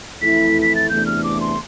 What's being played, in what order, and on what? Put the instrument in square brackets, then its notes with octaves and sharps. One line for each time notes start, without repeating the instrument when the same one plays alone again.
[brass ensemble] F2 E3 A3 E4 [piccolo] B6
[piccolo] B6
A6
[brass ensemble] E2 C3 E3 A3 D4 [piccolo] G6
[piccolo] F6
D6
C6